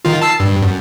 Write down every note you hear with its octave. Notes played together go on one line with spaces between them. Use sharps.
D#3 F4
A5 E6 C7
G2
F#2